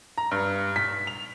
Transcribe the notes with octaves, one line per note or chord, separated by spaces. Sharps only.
A#5
G2
B6
F7